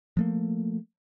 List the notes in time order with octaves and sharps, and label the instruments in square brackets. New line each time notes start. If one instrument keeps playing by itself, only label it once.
[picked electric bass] F3 A3 A#3